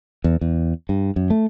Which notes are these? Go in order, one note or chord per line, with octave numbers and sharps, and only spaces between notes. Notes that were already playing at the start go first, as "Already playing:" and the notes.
E2
E2
G2
F#2
A3